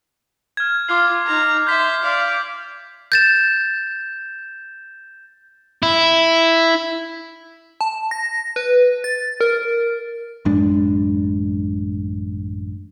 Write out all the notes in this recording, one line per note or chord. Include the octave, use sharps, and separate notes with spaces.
F6 G#6
F4 D6 F6 C7
D#4 A#5
E5 C6 G6 B6
D5 F5
G6 A6 E7
E4
A5
A#6
B4
A6
A#4
A1 F#2 G#3 D4